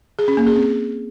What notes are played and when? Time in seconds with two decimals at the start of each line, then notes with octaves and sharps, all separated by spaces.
0.19 G#4
0.28 C#4
0.37 A#3
0.47 G#4
0.56 C4